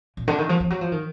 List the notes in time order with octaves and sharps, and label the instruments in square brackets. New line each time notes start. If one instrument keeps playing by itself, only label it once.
[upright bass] A#2
D3
D#3
F3
F3
F#3
F3
D#3